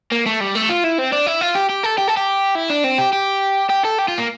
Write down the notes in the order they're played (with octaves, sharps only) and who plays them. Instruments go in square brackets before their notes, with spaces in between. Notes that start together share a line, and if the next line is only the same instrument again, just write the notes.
[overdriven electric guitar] A#3
A3
G3
A3
F4
E4
C4
D4
E4
F4
G4
G4
A4
G4
A4
G4
E4
D4
C4
G4
G4
G4
A4
G4
F4
A#3